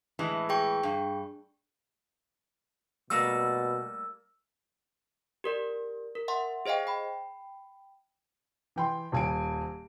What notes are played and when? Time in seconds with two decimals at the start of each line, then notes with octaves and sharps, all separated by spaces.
0.19 A2 E3 G#3
0.49 G#4 G5 C#6
0.83 G2
3.10 B2 G3 A3 A#3 E6
5.44 G4 A#4 D5
6.15 A#4
6.28 E5 F#5 C6
6.66 G#4 C5 D#5 F5 G5
6.87 G5 B5
8.76 E3 G5 C6
9.12 D#1 G#5 D7